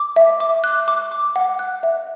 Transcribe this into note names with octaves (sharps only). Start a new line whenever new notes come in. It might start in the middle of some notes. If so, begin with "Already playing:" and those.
Already playing: D6
E5
D6
F#6
D6
D6
F#5
F#6
E5